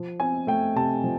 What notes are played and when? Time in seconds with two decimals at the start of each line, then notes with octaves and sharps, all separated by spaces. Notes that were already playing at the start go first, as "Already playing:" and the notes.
Already playing: F3
0.20 C4 G#5
0.47 A3 G5
0.75 C3 A5
1.04 F3